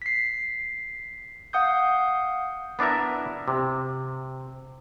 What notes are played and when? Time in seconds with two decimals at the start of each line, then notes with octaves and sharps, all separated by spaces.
0.02 B6 C7
1.53 F5 F#5 D#6 G6
2.79 B3 D4 E4 A#4 E5
3.48 C3